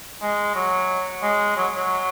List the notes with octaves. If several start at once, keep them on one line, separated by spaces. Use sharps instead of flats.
G#3
F#3
G#3
F#3
F#3